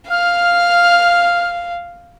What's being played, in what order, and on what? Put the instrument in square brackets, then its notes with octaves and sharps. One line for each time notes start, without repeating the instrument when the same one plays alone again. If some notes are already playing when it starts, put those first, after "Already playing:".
[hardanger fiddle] F5 [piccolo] F6